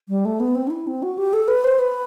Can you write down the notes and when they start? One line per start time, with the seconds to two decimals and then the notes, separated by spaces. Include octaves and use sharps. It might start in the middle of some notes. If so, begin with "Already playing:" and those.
0.09 G3
0.25 A3
0.40 B3
0.55 C4
0.67 D4
0.70 E4
0.87 C4
1.03 F#4
1.18 G4
1.33 A4
1.48 B4
1.64 C5
1.79 B4